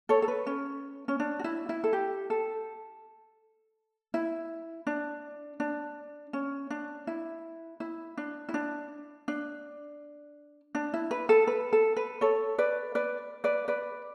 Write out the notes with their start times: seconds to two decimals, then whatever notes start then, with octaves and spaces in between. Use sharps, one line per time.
0.09 A4 C#5
0.22 A4
0.28 B4
0.47 C#4
1.08 C#4
1.20 D4
1.39 F#4
1.44 E4
1.69 E4
1.84 A4
1.93 G4
2.30 A4
4.14 E4
4.87 D4
5.60 D4
6.33 C#4
6.70 D4
7.07 E4
7.80 E4
8.17 D4
8.49 E4
8.54 D4
9.28 D4
10.75 D4
10.94 E4
11.11 B4
11.29 A4
11.47 B4
11.73 A4
11.96 B4
12.21 A4 C#5
12.58 B4 D5
12.95 B4 D5
13.44 B4 D5
13.68 B4 D5